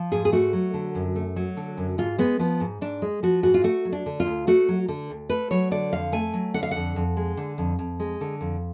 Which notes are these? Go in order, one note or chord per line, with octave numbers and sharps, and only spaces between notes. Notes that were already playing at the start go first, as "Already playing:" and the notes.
Already playing: F3
G#2 G#4
G#4
A3 F#4
F#3
D3
F#2
A3
F#3
D3
F#2
G#2 F4
G#3 B3
F3 B3
G#2
G#2 D4
G#3
F3 F#4
G#2 F#4
F4
A3 F#4
F#3
D4
D3
F4
D2
A3 F#4
F#3
D3
D2
A3 B4
F#3 C#5
D3 D5
F2 F5
A3 G#5
F#3
D3 F#5
F5
F2 F#5
F2
G#3
D3
F2
F2
G#3
D3
F2